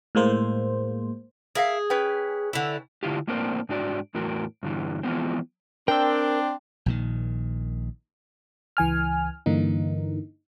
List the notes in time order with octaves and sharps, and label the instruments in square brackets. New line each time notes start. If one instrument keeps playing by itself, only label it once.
[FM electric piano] A2 G#3 A#3 C5
[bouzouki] G#4 [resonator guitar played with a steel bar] A#4 E5 F5
[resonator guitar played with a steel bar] C#4 B4 G5
[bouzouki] D3 E4
[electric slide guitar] D3 E4 F4 G4
A2 A#3 C4 D4 A#4 C5
G#2 D4 F#4 D5
E2 A2 F#4 A#4
G2 D3 E3
E3 F3 G#3 B3 C4
[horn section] C4 D4 [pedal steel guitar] A#4 E6 [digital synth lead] G5
[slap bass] A#1 A#2 D#3
[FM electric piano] C#2 E3 G#5 F6
G2 D3 E3 A#3 D#4